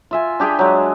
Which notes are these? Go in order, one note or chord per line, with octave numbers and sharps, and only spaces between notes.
F4 E5 G#5
D4 G4 G#4 G5
F#3 G#3